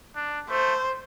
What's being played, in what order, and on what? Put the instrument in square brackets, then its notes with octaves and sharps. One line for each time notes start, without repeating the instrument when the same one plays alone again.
[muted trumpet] D4
[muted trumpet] A3 [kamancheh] C5